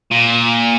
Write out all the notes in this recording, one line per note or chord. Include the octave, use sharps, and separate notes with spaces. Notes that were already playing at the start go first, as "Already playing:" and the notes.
A#2